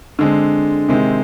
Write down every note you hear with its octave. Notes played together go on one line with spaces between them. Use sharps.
D3 G#3 C4
C3 D#3 G#3 C4